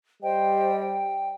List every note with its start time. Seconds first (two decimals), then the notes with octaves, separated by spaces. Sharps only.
0.23 G3 C5 D#5 G5
0.80 G5